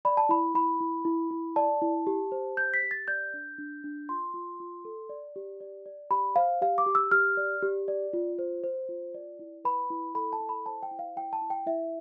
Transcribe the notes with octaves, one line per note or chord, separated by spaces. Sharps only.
D5 B5
A5
E4 B5
E4 B5
E4
E4
E4
D5 A5
E4
G4
C5
G4 G6
B6
G4
A6
D5 G6
D4
D4
D4
F4 C6
F4
F4
A4
D5
G4
D5
D5
G4 B5
C5 F5
G4 F5
D6
G4
E6
G4 F6
D5
G4
D5
F4
C5
C5
F4
D5
E4
B4 B5
E4
A4 B5
A5
E4
B5
C5 A5
G5
E4
F5
E4 G5
A5
E4
G5
E4 E5